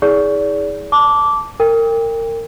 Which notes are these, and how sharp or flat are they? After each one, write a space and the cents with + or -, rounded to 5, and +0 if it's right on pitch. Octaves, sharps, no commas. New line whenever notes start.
E4 -30 G#4 +5 D5 -35
A5 +0 D6 -15
A#4 -30 G5 +25